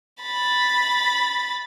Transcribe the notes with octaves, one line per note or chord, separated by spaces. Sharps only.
B5 A6